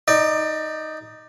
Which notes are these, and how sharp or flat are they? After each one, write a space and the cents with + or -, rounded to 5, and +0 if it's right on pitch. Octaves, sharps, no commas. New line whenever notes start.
D#4 +5 D5 +25